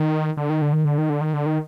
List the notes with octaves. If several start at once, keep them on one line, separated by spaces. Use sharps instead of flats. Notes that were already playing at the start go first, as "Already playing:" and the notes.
Already playing: D#3
D3
D#3
D3
D#3
D3
D#3
D3
D#3
D3
D#3